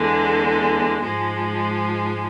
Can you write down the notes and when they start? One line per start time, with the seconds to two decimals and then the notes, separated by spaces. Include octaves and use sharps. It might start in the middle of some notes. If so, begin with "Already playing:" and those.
Already playing: E2 D3 G#3
1.03 G#2 F3 G#3